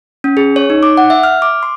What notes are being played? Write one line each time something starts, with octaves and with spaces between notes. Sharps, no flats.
C#4
G#4
C#5
D#4
D6
F#5
E5
F6
D6
C6